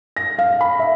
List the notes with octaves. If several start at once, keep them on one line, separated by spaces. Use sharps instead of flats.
A#6
F5
B5
E5